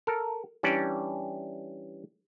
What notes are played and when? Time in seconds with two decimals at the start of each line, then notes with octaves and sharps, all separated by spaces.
0.07 A4 A#4
0.63 E3 G3 C#4 D4 D5